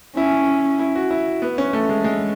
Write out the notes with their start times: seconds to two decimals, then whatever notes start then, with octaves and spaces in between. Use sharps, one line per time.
0.17 C#4 E4
0.79 E4
0.95 F#4
1.11 E4
1.42 B3
1.58 C#4
1.73 A3
1.89 G#3
2.04 G#3